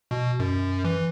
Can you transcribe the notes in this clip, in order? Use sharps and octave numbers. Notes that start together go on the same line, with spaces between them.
B2
F#2
E3